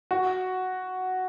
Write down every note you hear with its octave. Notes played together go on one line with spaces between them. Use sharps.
F#4